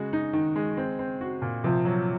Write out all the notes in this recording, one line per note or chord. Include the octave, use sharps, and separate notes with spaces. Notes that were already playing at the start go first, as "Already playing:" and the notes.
Already playing: C#3 G#3 F#4
D#4
D#3
G#3
C4
C4
F#4
A#2
C3 F3
F#3